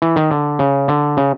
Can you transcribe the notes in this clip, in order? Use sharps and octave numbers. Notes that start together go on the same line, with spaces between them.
E3
D#3
D3
C#3
D3
C#3